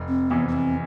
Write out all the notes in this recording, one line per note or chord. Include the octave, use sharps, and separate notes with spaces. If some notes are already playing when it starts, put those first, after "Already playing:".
Already playing: F1
C4
E2 C3 E3 B3
B3
C4